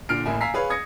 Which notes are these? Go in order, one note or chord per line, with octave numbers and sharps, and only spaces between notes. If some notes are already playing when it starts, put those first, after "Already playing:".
A#2 D3 F6 C7 D7
A1 A2 A#3 E5 G#5
F5 G#5 A#5 E6 B6 C7
G#4 B4 C#5 F5
D#6 G#6 A#6 C#7